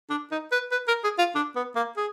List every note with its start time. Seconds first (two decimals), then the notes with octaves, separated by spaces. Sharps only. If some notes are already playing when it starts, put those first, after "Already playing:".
0.10 D4
0.31 D#4
0.52 B4
0.72 B4
0.88 A#4
1.04 G#4
1.18 F4
1.35 D4
1.56 B3
1.76 A#3
1.97 G#4